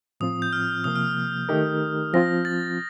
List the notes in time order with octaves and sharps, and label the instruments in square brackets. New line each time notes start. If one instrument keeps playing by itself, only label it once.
[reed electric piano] A2 F3 C4 F4 [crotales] D#6
[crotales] G6
F6
[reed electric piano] C3 F3 A#3 [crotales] D#6
[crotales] F6
[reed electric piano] D#3 A3 D#4 G4 A#4
[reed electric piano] F3 C4 F4 [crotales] A#6
[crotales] A6